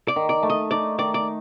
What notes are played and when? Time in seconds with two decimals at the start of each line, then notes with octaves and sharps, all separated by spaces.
0.08 D5
0.16 D#3
0.29 D5
0.43 A3
0.50 D#5
0.71 D#4 D5
0.98 D#3 D5
1.14 D5